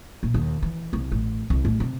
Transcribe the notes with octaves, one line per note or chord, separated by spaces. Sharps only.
A#2
D#2
E3
C2
A1
C2
A1
C3